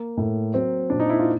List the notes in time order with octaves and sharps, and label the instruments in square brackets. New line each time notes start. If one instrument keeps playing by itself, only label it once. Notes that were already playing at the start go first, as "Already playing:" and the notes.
Already playing: [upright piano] A#3
[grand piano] A2
[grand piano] F#3 [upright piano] C4
[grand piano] A#2 [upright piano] D4
[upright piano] D#4
E4
F4